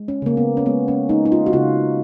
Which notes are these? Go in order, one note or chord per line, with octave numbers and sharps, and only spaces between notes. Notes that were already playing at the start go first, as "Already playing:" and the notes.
Already playing: G#3
C#4
C#3 A#3
B3
C#4
G#3 B3
C#4
G#3 D#4
D#4
F4
F#4
C#3 F4